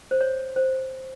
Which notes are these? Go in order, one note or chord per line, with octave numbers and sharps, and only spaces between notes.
C5
C#5
C5